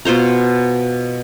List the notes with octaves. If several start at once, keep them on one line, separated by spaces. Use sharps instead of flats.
B2 F4 C5 A#5